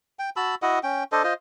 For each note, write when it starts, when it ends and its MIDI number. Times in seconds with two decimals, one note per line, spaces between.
0.19 0.30 79
0.36 0.55 66
0.36 0.55 81
0.36 0.55 83
0.36 0.55 88
0.62 0.79 64
0.62 0.79 66
0.62 0.79 75
0.62 0.79 78
0.83 1.04 61
0.83 1.04 79
1.12 1.23 62
1.12 1.23 69
1.12 1.23 72
1.12 1.23 75
1.24 1.34 65
1.24 1.34 72
1.24 1.34 75